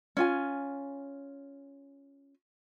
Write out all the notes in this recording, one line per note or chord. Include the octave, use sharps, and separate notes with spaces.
C#4 F4 G#5